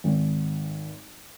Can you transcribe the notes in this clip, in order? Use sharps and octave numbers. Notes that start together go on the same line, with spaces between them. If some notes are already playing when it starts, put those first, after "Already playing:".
G#1